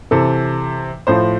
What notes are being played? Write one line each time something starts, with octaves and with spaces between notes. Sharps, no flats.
C3 E3 A4
A2 F3 C5